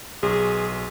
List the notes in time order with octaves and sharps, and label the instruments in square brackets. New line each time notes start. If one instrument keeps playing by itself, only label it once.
[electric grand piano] B1 [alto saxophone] G#4